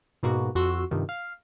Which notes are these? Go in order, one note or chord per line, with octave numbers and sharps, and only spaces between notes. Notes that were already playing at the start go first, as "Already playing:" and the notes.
G#2 B2 A#3 F#4
F2 F#4 C6 E6
G2 C3 D#3 F3
F5